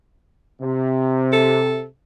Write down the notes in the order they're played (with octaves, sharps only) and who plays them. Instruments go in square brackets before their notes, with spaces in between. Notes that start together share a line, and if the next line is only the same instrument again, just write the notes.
[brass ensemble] C3
[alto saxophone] A4